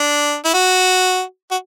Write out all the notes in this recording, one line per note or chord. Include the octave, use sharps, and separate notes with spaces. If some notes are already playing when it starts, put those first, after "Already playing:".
Already playing: D4
E4
F#4
F#4